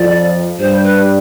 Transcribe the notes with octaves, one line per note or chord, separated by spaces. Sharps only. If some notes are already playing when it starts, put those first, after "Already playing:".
Already playing: F2 F3 D5
G2 G3 C5
B4